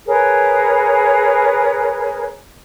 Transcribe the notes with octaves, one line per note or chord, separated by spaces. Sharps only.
G#4 A#4 B4 C#5